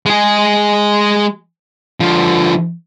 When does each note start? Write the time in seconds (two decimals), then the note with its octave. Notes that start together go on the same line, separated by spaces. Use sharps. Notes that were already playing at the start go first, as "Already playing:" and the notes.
0.06 G#3 G#4
2.00 D3 F3